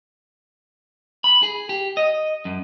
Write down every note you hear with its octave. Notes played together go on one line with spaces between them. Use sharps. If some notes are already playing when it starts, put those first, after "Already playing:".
B5
G#4
G4
D#5
F#2